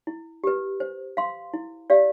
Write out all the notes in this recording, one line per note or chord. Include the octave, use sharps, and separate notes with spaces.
E4
G4 B4
C5
F5 C6
E4
G4 D5 F5